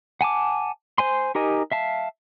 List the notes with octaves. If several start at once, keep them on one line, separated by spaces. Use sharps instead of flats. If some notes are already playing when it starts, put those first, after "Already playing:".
F#5 G#5 A5 D6
C5 G#5 C6
D#4 G4 A#4 D#5 G#5
E5 F5 A5